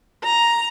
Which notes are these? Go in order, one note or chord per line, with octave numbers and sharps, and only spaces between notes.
A#5